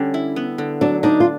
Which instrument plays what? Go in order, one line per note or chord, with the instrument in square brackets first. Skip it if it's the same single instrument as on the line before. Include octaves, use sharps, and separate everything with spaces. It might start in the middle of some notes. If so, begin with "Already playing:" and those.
Already playing: [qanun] D3 G3 [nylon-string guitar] C#4
[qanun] E4
B3
D3
[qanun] F#3 [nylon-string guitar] D4
[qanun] D4 [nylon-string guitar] D#4
[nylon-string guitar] F4